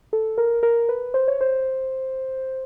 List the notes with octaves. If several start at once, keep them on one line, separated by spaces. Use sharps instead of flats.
A4
A#4
A#4
B4
C5
C#5
C5